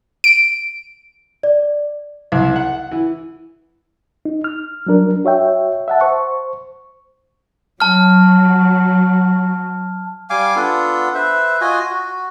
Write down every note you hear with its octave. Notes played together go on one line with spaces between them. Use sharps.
D7
D5
C2
F#5
E3
D#4
F6
F#3 G3 D4 A#4
F#4 C#5 E5 G5
E5 F#5 A5
C5 C#6
F#3 A5 F6
G3 F5 G#5 D6
B3 D4 F4 A4
B4 C5 E5
F4 F#4 D#5 G#5
F#4